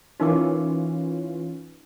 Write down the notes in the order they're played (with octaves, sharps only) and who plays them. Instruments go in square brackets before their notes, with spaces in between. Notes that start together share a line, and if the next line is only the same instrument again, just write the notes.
[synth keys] E3 C#4 F4 [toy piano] D#4 A#4 D6